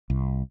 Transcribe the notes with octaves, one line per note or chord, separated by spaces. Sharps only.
C2